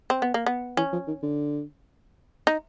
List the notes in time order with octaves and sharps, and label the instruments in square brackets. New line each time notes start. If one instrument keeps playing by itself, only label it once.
[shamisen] C4
B3
A#3
B3
[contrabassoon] E3 [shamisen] C#4
[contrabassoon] F3
D#3
D3
[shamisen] D#4